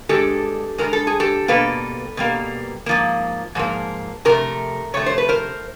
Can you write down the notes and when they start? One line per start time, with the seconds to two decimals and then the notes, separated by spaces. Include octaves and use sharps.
0.09 G2 D#3 G#3 G4 A4
0.78 G2 D#3 G#3 A#4
0.93 A4
1.07 G#4
1.20 G4 A4
1.48 B2 G3 A#3 A4 B4
2.17 B2 G3 A#3
2.86 G#2 F3 A#3
3.55 G#2 F3 A#3
4.25 F2 C3 A3 A#4
4.94 F2 C3 A3 C#5
5.06 C5
5.18 B4
5.29 A#4 C5